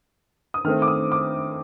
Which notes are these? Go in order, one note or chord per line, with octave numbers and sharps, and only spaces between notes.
D#6
D#3 A3 C4 F6
D6
D#6
D6